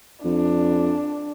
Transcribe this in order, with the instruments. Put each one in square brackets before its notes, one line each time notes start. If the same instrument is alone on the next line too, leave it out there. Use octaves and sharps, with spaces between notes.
[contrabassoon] F2 [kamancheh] D4